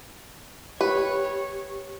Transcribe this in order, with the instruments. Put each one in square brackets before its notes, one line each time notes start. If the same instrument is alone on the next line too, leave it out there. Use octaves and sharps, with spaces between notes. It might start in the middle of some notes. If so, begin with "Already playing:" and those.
[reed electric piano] G4 [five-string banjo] B4 [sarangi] C#5